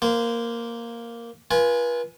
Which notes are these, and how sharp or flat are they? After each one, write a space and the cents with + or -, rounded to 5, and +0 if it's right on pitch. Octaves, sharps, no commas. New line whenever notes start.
A#3 +0 C5 -25
F4 -20 B4 -35 G#5 +0